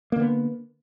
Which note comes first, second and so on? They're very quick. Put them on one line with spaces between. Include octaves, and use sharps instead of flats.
A#3 D3 B3